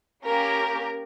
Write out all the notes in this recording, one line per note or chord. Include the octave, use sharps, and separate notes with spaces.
A#3 C#4 G4 A#4